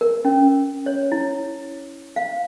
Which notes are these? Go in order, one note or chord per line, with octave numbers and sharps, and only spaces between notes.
A#4
C#4
C#5
E4
F5